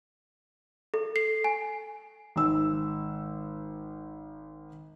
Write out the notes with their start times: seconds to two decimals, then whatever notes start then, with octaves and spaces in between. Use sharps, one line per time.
0.94 A4
1.16 C7
1.44 G#5
2.36 G#1 E6